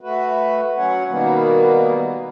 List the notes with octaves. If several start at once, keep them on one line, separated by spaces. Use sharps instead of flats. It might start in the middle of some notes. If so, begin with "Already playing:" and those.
A3 F#4 B4
F#3 C#4 C#5 F#5
B2 D#3 G3 A#3 B3